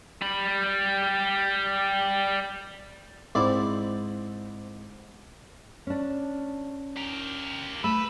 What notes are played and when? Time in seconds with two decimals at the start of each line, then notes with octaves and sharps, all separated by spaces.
0.22 G3 B5
3.35 G#2 C4 E4 D5
5.87 C#4 D4
6.97 G4 A#4
7.84 A3 B4 B5 E6